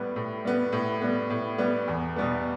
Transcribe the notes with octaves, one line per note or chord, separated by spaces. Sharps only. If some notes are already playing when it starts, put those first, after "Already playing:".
Already playing: A2 G3 B3
A2
G3 B3
A2
G3 B3
A2
G3 B3
E2
B2 G3 B3